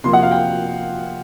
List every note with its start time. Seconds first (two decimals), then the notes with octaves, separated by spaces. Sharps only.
0.04 C3 F3 A#3 C6
0.13 F#5
0.23 F5
0.31 G5